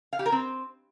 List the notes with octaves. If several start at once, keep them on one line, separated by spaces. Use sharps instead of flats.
F5
G4
A#4
C4